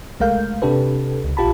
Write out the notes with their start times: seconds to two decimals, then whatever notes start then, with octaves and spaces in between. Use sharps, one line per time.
0.20 C2 G#3 A3 A#4 F5 G6
0.62 C3 D4 G4 A4 B4
1.24 C#2
1.37 A#1 F4 G4 A5 B5